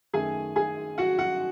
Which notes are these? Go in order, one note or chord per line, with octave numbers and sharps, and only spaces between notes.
F#2 D#3 A3 G#4 G#5
G#4 G#5
F#4 F#5
F#4 F#5